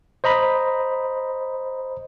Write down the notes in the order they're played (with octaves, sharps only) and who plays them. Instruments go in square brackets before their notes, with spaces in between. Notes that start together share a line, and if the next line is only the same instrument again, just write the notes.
[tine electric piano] C5 D#5 A#5 B5